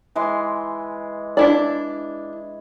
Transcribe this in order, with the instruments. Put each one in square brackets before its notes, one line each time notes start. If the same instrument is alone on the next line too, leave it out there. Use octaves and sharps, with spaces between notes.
[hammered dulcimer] E3 G#3 C6
[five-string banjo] D4 E4 D5